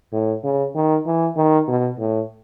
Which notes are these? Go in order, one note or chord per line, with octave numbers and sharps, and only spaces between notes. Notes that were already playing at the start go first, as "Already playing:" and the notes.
A2
C#3
D#3
E3
D#3
B2
A2